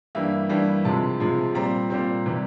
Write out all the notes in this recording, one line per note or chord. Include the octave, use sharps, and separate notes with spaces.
G2 E3 G3 A#3 E5
G2 E3 G3 A#3
C3 F3 G#3 A5
C3 F3 G#3
A#2 G3 C4 A#5
A#2 G3 C4
C3 E3 G3